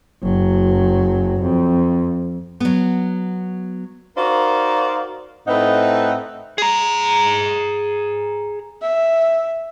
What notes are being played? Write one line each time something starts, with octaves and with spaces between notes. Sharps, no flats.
F#1 F#3
F2
F#3 B3
D#4 F#4 A#4 C5 D5 F5
A2 C4 D#4 B4 E5 F#5
G#4 A#5
E5